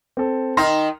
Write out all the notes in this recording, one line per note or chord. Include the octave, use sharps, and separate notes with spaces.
C4 A4
D#3 D#4 C6 F6 A#6